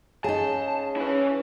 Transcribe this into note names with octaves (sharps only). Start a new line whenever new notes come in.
C#3 D#4 G#4 A5
C#4 E4 B4